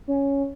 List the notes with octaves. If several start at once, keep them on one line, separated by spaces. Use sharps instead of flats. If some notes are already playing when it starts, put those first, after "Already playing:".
C#4